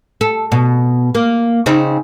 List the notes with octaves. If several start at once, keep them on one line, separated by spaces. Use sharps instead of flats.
A4
B2
A#3
C#3 C4 D#4